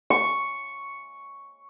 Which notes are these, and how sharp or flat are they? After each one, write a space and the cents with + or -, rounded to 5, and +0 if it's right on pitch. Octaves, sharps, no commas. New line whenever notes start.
C#6 +0